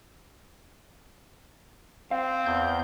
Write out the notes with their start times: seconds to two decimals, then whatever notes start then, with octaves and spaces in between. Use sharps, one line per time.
2.11 C4 F5
2.46 E2 G6